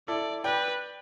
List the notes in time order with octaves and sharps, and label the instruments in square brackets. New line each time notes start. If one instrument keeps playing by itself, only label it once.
[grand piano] E4 A4 [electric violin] D5
[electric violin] B4 [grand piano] D5 G5